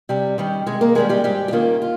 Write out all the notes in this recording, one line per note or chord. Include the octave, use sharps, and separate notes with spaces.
C3 G3 G4
D#3 G3 C#4
C3 G#3 G#4
A#3 A#4
D#3 G3 G#3 C#4 G#4
G3 G4
G#2 G3 G4
G4
D#3 A#3 C#4 F4
F4